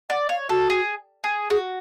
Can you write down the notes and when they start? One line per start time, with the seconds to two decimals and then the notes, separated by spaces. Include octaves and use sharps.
0.09 D5 F#5
0.29 C#5 F5
0.49 F#4 A4
0.70 G#4
1.24 G#4
1.50 F#4 G#4